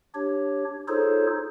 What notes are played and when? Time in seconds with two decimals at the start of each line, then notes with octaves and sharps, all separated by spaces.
0.15 D4 G4 C#5
0.88 D#4 F4 G#4 A4 C5 C#5